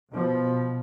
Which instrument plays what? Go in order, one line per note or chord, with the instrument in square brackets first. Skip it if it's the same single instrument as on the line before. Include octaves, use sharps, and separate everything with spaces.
[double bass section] B2 F3